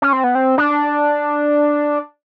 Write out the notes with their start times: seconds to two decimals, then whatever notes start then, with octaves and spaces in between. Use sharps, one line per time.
0.02 C#4
0.13 C4
0.24 B3
0.35 C4
0.58 D4